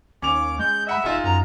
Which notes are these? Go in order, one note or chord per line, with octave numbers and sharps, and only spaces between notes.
D#2 C#4 D6 F7
G#3 G6
D#5 E5 F#5 B5
D#1 G#3 D#4 F4
F#2 A#5